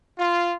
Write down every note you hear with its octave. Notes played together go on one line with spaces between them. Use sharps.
F4